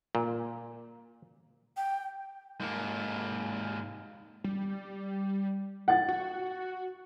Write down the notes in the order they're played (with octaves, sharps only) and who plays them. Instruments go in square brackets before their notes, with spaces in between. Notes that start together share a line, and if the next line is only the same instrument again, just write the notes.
[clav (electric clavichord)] A#2
[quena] G5
[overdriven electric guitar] G#2 A#3
[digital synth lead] G3
[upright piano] F#5 A6
[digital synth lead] F#4